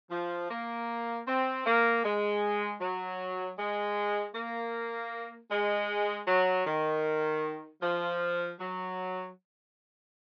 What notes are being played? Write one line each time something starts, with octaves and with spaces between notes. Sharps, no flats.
F3
A#3
C4
A#3
G#3
F#3
G#3
A#3
G#3
F#3
D#3
F3
F#3